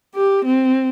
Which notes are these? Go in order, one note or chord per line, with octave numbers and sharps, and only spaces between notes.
G4
C4